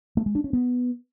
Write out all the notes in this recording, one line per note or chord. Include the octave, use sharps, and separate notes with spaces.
A3
G#3
D4
C#4
B3